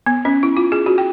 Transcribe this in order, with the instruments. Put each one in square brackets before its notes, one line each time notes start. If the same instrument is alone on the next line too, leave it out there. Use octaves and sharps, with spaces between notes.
[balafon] B3
C#4
E4
F4
G#4
F#4
G5